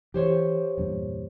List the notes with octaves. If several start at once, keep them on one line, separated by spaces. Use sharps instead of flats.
E3 G4 C5 C#5
E2 G2 A#2